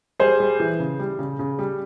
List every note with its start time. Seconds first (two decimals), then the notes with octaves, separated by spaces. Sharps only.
0.20 G3 G#4 C5
0.40 G3
0.60 E3
0.79 C#3
1.00 G3
1.19 C#3
1.39 C#3
1.59 G3